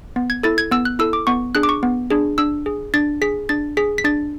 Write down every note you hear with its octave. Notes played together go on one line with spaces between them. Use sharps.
B3
G#6
E4 A4 A6
G#6
B3 E6
F#6
E4 A4 E6
D6
B3 C#6
D4 G#4 F#6
D6
C#6
B3
D4 G#4
D4 E6
G#4
D4 A6
G#4 B6
D4 A6
G#4 B6
B6
D4 A6